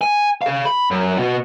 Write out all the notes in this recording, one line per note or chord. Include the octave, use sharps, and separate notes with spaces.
G#5
G#4 F5
B5
F#2
B2 F#4